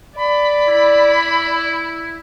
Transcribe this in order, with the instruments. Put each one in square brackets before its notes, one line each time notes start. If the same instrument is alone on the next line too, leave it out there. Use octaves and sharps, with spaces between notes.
[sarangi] D5 [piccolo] B5
[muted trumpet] E4